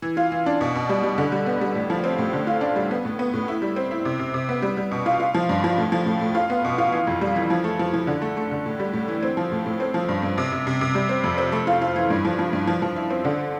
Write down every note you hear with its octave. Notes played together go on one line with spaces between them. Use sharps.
E3
F4
E3
D4
B2
B2
G3
G3
D3
G3
B3
G3
A2
F3
C4
A2
D3
F4
D4
G3
B3
A2
B3
A2
E4
G3
C4
E4
C3
C3
C3
B3
G3
G3
B2
F4
F4
F3
G2
F3
A2
F3
A2
A2
F4
B3
B2
F4
E3
F2
G3
E3
F3
A3
F3
F3
D3
A3
A3
D3
A2
G3
A2
E3
C4
F3
A2
A2
C4
F3
G2
G2
C3
C3
C3
C3
G3
C4
F2
C4
A3
F4
F4
E3
G2
F3
F3
G2
F3
F3
E4
C4
D3